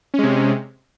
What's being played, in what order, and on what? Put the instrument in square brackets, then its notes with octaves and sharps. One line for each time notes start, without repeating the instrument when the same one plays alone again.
[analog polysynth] C#4
G#3
C3